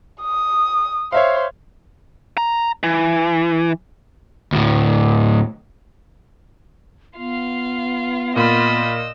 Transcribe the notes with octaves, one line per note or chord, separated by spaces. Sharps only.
D#6
C5 C#5 E5 F5
A#5
E3
D2 A2
B3 F4 F5
A#2 F4 D#5 B5 E6